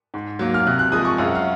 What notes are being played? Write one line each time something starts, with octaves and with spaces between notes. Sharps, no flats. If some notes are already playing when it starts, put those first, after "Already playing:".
G#2
F#3 A#3
F6
C3 F#6
F#6
F3 G#3 D#6
C#6
F#2 F5
F#5
F5